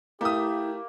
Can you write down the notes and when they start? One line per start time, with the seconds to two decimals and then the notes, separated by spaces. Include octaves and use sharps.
0.21 A3 A#3 E4 G4 E5 D#6